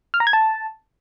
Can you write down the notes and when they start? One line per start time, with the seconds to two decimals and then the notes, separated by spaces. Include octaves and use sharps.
0.14 F6
0.20 A#5
0.27 G#6
0.33 A5